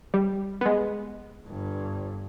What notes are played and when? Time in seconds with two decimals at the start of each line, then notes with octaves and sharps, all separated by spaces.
0.14 G3
0.61 G#3 B3
1.47 G1 G2